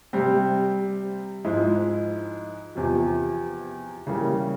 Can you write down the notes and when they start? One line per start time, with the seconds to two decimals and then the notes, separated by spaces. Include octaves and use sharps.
0.13 C3 G3 C4
1.45 G#2 F3 G#3 E4
2.75 E2 C3 F3
4.07 C#3 E3 G3 A#3